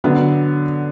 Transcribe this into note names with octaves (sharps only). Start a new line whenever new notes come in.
D3 F#3 B3